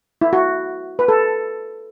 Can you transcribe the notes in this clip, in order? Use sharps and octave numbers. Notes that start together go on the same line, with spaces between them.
E4
F#4
B4
A4